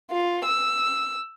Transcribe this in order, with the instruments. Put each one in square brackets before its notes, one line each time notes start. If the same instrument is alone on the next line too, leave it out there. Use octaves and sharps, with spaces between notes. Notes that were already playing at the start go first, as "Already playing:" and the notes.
[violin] F4
E6